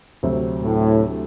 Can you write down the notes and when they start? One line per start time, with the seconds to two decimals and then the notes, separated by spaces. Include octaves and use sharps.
0.23 D2 C3 F#3 C4
0.62 A2